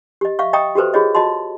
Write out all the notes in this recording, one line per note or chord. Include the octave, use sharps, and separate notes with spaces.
G4 D#5
E5 F5 C#6
D#5 G5 A#5 C#6 D#6
F#4 G4 A4 B4 C5
F4 G4 G#4 C#5 D#5
F4 F#4 D#5 A5 C6